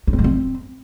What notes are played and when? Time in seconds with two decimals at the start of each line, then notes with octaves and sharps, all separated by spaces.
0.07 C#4
0.13 C4
0.19 G#3
0.24 C4